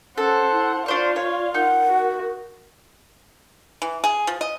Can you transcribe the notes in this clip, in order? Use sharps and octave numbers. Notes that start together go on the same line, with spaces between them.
C#4 A4 C5 F#5
E4
D4 F4 C5 D5 F5 C#6
C#5
D#4 A#4 F#5
F#4
E3
G#4
F3
D#5